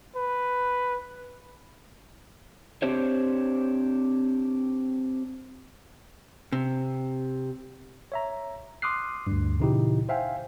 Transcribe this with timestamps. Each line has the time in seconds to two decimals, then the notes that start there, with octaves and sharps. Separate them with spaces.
0.16 B4
2.82 C4 D4 G4 C5 C#5
6.52 C3
8.12 C#5 E5 A#5
8.82 C6 D6 D#6 F6 F#6 C7
9.27 D2 G2
9.59 A#2 C#3 E3 D#4 E4 G4
10.09 C5 E5 F5 G5 G#5